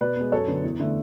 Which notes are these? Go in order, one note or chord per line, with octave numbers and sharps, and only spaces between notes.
B2 B4 D5
G#3 B3
F#2 A4 C#5
D3 F#3 B3
E2
D3 A3